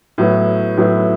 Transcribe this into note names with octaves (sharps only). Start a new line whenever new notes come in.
A2 F#3 B3 E4
A2 F#3 B3 E4